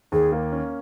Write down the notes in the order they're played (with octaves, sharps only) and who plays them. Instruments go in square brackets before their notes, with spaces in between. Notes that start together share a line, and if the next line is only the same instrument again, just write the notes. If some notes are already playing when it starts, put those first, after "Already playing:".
[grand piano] D#2 [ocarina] G#4
[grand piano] A#3
C#4